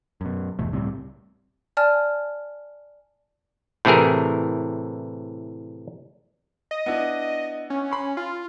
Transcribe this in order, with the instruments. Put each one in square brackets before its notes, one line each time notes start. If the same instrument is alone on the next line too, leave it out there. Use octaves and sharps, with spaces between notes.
[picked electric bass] F#2 B2
G1 E2 B2 A3
C#2 A2 G3 C4
[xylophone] D5 G#5 A5 F6
[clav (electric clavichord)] A2 C3 E3 G#4 A#4
[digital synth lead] D#5
[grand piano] B3 D4 E4
[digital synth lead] C#4
[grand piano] B5 C6
[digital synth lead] F4